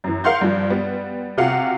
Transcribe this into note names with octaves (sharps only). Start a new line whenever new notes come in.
F#2 E3
A#4 F5 F#5 C6 G6
G2 F3
G3 B3
C3 F4 F#4 F5 F#5